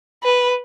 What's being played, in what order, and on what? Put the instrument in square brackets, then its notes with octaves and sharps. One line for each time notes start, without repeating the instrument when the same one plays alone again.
[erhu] B4